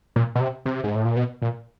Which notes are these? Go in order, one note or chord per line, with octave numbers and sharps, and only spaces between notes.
A#2
B2
C3
C3
G#2
A2
A#2
B2
A#2